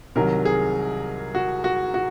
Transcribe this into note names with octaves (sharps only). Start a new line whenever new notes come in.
C2 C3 D#3 F#3 A#4
G#4
F#4
F#4
F#4